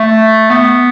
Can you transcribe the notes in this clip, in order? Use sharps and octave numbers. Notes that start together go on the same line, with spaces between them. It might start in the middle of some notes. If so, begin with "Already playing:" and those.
Already playing: A3
B3